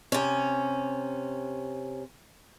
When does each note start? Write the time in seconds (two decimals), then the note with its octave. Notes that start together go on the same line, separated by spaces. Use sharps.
0.12 C3 C#4